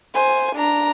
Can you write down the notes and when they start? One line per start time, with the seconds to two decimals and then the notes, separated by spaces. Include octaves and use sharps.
0.14 C5 G#5
0.56 D4 A#5